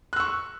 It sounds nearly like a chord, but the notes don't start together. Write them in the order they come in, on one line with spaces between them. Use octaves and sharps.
F#6 E6 C#6